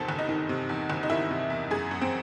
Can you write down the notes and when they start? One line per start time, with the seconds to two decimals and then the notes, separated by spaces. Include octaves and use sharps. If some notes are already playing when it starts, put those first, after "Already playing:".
Already playing: E2 C3 D#3 A4 C5
0.09 F#1
0.18 D#4
0.29 D#3
0.49 C3
0.69 E2
0.90 F#1
1.03 D#4
1.10 D#3 E4
1.31 C3
1.50 E2
1.71 F#2 G#4
1.91 F#2
2.02 C4